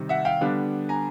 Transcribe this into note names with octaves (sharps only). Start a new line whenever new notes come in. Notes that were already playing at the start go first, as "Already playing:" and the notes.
Already playing: C3 D#3 G3
E5 F#5
F5 G5
D3 G3 B3 D4
G#5 A#5